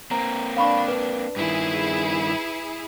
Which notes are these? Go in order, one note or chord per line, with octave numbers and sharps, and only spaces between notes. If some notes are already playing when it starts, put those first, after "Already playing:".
A#3 C4 A#5
D4 F5 B5 C#6
B4
G2 D#3 E4 G#4